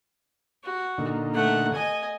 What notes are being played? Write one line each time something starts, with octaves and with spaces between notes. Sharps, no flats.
F#4
A#2 D3 D#4
A3 F#5
D#5 G#5